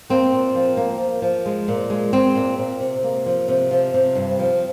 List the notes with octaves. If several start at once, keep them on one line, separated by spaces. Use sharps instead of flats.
A#3 C4
A#2
F3
A#3
F3
F3
G#3
A#2
G#3
G#3 C4
A#2
A#2
C3
A#3
F3
C3
F3
C3
G2
F3